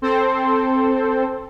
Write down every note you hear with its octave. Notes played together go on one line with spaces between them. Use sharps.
C4 A4 C5